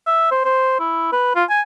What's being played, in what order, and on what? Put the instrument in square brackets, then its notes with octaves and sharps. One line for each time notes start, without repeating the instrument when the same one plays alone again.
[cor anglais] E5
C5
C5
E4
B4
F4
G#5